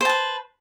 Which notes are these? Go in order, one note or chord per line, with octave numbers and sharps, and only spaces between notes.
B4 C5 A5